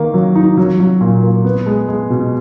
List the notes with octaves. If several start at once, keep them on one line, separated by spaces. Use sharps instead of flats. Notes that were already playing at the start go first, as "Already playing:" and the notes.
Already playing: D#3 A#3
F#3
D#4
F#3
F#3
A#2
A#3
B3
G#3
G#3
B2